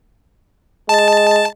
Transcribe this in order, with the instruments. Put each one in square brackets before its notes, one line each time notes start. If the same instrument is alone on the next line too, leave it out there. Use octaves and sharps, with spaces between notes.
[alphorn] G#3 [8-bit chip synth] A5